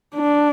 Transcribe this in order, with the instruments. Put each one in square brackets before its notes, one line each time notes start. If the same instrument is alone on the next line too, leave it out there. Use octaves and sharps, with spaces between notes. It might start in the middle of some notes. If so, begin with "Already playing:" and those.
[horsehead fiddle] D4